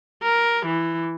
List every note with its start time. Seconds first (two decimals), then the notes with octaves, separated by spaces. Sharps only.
0.23 A#4
0.66 E3